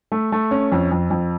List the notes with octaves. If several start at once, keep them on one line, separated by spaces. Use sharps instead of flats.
A3
A3
C#4
F2
F2
F2